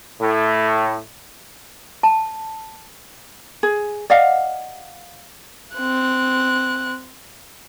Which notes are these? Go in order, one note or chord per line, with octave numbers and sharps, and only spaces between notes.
A2
A5
G#4
D5 D#5 F5 F#5
C4 F#6